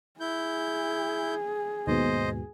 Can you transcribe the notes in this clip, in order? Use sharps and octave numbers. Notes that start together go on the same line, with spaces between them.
E4 G#4 G6
D#2 G#2 B2 C5 D#5